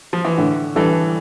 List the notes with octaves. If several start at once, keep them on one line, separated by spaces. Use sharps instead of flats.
F3
E3
A2 D3
E3 G3 D4 A4